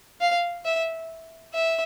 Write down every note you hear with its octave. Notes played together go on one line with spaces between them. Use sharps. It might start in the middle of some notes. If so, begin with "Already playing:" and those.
F5
E5
E5